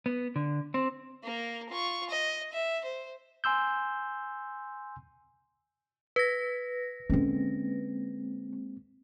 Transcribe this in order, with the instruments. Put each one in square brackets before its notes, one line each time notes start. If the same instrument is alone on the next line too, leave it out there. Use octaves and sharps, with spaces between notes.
[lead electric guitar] B3
D3
C4
[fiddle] A#3 A#4
F4 C#6
D#5
E5
C5
[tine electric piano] G#5 C6 E6 G6
[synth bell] B4 A#6 [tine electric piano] G#6 B6
[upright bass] D3 C#4 [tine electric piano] G#3 A#3 C4